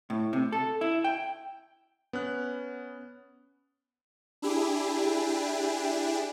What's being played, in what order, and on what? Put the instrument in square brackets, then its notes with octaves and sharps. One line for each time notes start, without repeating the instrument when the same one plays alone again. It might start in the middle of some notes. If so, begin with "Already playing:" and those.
[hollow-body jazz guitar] A2
C3
A4
E4
G5
[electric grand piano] B3 C#4 F#6
[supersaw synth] D4 E4 G4 G#4